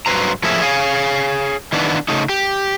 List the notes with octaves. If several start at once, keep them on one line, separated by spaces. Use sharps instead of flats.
G2 F#3 F#4 B4 C5 A#5
A2 F3 A#3 C#4 G#4 E5
G#4 C#5 F5 G#5
D#3 E3 B3 D4
C#3 A3 D#4
G4